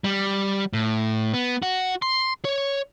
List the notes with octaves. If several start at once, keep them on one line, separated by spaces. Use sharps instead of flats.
G3
A2
B3
F#4
C6
C#5